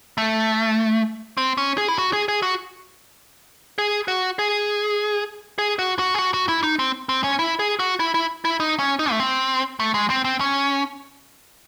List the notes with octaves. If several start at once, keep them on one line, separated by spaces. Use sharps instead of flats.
A3
C4
C#4
G#4
E4
F#4
G#4
G#4
F#4
G#4
F#4
G#4
G#4
F#4
F#4
G#4
F#4
F#4
E4
D#4
C4
C4
C#4
E4
G#4
F#4
E4
E4
E4
D#4
C#4
D#4
A3
C4
A3
G#3
C4
C4
C#4